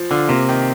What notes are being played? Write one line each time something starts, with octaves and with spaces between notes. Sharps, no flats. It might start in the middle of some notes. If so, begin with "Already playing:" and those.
Already playing: F3
D3 F4
C3 A#3
D#3